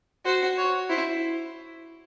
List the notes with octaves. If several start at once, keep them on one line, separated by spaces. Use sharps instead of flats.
F#4 C5
C#5
E4 C5